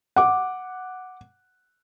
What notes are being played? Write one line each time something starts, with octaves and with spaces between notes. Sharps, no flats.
F#5 D6